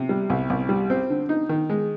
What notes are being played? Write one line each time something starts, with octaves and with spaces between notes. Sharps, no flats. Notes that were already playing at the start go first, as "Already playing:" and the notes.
Already playing: C3
G3
C2
C2
G3
C4
D3
D#4
D#3
G#3